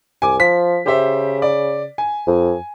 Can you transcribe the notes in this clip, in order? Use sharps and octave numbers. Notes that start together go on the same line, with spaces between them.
C2 G#5 D6
F3 B6
C#3 G4 C5 E5
D5
G#5
F2